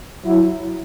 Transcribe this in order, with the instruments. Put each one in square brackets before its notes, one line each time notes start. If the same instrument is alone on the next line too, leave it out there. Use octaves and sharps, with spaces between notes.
[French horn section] F#3 E4